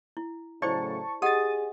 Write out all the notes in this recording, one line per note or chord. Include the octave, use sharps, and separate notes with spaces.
E4
A2 C#3 F#3 E4 C5 D5 A5 C#6
G4 G#4 D#5 F#5 D#6 A6